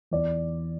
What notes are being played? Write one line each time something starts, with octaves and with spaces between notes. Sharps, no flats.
E2 D5